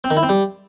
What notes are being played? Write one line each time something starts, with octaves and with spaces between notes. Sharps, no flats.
C4
D#3
E4
C4
G3